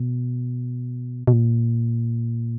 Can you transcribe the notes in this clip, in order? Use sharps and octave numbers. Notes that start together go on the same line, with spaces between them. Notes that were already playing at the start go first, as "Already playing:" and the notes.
Already playing: B2
B2
A#2